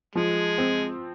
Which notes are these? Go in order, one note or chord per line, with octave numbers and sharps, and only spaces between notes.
F3 G#3
C4